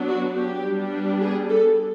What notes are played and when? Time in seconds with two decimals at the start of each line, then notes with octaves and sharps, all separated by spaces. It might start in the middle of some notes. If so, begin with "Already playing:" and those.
Already playing: F#3 B3 D4
0.09 F#4
0.37 G4
0.65 G3 B3 D4
1.21 G#4
1.49 A4